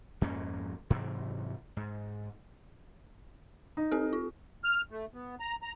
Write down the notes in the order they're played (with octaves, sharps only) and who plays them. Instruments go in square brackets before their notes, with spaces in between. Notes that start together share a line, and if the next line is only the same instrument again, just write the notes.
[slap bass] F2 G#2 A#3 C#4
G#2 C3 E3 F#3
G#2
[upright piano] D#4
[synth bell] C4 G4 A4
F4
[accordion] F6
A3
B3
A#5
A#5